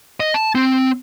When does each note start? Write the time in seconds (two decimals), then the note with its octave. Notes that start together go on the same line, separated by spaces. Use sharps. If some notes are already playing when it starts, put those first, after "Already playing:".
0.20 D#5
0.34 A5
0.55 C4